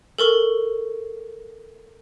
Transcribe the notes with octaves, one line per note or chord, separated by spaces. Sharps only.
A4 A#4 C#6